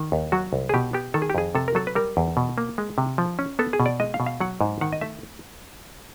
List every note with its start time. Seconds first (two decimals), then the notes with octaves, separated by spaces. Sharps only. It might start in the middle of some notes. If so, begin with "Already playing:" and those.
Already playing: D#3
0.12 D#2
0.32 F#3 F#4
0.53 C2
0.69 G#4
0.74 B2 G4
0.93 B3 G4
1.14 D#3 A4
1.22 G#4
1.30 G4
1.35 F2 G#4
1.55 C3 A4
1.68 A#4
1.75 F#3 A4
1.87 B4
1.95 G3 A#4
2.17 E2
2.37 B2
2.58 A#3
2.78 G#3
2.98 C3
3.18 F3
3.39 C#4
3.59 B3 A4
3.73 G#4
3.80 B2
3.86 D5
4.00 G#3 D#5
4.14 F5
4.20 B2
4.26 F5
4.40 F#3 F#5
4.61 G#2
4.81 D#3 F#5
4.93 D#5
5.01 A3 E5